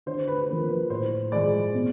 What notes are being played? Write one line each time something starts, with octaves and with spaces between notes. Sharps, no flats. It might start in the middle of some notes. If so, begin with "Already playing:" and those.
D3 C5
B4
F3 A#3
B4
A2 C5
F3 G#3 D5
B2